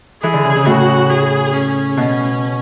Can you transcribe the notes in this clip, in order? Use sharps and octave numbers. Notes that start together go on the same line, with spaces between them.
E3 G#4
D3
C#3
C#3
A2 F#4
G#4
C#4
B2